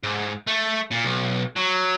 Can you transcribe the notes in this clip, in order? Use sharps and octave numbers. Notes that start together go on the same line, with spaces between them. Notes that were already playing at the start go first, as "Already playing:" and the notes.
G#2
A3
A#2
B1
F#3